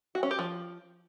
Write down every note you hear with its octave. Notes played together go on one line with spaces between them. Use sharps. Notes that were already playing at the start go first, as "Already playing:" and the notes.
F#4
C#4
G4
F3